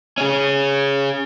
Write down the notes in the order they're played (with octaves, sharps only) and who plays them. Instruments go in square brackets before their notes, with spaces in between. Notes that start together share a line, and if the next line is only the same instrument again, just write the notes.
[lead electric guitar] C#4 G#4